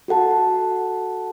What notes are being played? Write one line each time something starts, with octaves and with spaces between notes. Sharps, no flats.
F#4 A4 F#5 A5